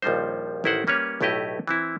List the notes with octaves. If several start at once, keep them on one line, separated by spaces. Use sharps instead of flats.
A#1 D#2 F3 G3 D#4 C5
A1 D#3 E4 A#4 C5 F#5
G3 A#3 C#4 B4 C#5
B1 A2 A3 E4 G4 D#5
E3 C4 E4